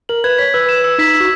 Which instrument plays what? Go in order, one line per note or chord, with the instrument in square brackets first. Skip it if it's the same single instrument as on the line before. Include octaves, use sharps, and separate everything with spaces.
[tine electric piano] A#4 [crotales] F#7
[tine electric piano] B4 [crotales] G#6
[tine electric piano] C#5 [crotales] B6
[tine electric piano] B4 [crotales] E6
[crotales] E7
E6
[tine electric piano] D#4 [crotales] B6
[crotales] E6
[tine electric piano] F#4